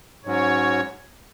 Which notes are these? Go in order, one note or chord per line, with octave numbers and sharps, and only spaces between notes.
G#2 F#3 C#4 F#4 C#5